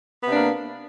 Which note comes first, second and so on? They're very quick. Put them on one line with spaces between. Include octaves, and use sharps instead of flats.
B3 C3 D4 A#3